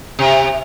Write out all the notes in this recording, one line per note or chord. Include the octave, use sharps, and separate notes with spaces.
C3